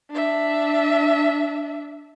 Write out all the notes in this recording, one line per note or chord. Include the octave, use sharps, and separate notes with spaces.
D4 E5